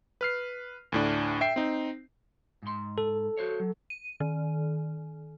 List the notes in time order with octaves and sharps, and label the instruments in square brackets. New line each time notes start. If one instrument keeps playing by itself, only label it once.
[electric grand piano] B4 F6 C7
D2 A2 D4
E5 G5 C7
C4 D#4
[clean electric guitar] G#2 C6
[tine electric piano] A4
[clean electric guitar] F#4 C5 C#5
F#3
[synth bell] D#7
D#3